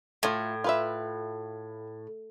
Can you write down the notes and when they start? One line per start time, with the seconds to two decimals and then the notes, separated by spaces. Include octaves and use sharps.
0.23 A2 A3 F4
0.64 F4 B4 E5